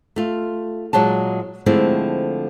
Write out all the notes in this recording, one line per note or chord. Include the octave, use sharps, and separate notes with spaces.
A3 F4
A#2 F#3 G#3 A5
D3 F3 G#3 A3 C4 E4